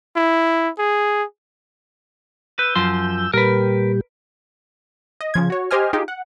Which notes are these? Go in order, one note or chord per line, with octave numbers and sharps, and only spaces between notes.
E4
G#4
B4 E6 G6
F#2 F3 C6
A#2 G3 G4 A#4 B4
D#5
C#3 F3 G#6
F#4 C#5
G4 C5 D#5 G#5 F6
D#4 F4 G4 G#4
F#5